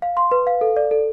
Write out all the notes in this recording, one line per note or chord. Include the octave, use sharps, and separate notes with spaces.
F5
C6
B4
F5
A4
D5
A4